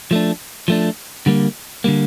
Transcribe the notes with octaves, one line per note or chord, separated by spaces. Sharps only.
F3 A3 D4
F3 A3 D4
D3 G3 A#3
D3 G3 A#3